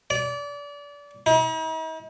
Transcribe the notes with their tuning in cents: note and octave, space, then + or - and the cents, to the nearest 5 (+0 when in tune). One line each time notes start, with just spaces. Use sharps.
D5 -30
D#4 +45